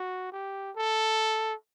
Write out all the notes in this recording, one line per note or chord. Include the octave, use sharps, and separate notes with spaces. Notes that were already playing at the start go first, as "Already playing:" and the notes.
Already playing: F#4
G4
A4